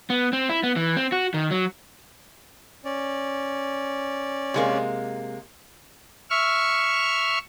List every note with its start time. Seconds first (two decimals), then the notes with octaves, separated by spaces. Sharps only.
0.10 B3
0.33 C4
0.49 E4
0.63 B3
0.76 E3
0.96 C4
1.12 F#4
1.34 D#3
1.51 F#3
2.85 C#4 D5
4.54 C3 G#3 A#3
6.30 E5 C#6 F6